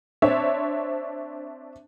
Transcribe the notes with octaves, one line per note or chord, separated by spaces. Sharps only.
C4 D4 C5 C#5 E5